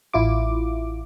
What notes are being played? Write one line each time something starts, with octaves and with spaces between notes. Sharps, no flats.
A1 E4 F4 D6